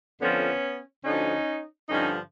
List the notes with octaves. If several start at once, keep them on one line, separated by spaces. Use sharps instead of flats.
F2 D3 F3 B3 C#4
D2 D3 F3 C#4 D#4
G2 D3 F3 C#4 D#4